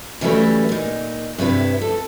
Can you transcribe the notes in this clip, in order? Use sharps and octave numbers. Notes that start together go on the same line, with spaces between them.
C#3 E3 F#3 G3 A3 B4
A#2 D#4
G2 C3 E4 B4
A4